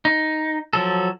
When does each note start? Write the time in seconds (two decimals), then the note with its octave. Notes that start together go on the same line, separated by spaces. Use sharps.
0.05 D#4
0.73 F3 F#3 A4